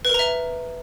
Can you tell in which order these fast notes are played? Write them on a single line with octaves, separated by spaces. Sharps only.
B4 A#4 A#5 E5